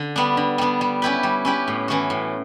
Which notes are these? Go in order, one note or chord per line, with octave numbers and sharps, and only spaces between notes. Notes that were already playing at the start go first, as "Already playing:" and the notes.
Already playing: D3
G3 B3 D4
D3
G3 B3 D4
G3
C#4 E4 G4 B4
G3
C#4 E4 G4 B4
A2
E3 A3 C#4 F#4
A2